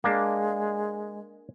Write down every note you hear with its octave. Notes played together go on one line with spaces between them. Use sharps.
G#3 A#3 D4